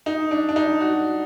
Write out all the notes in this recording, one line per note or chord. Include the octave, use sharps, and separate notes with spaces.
D#4
D4
D4
D#4
F#4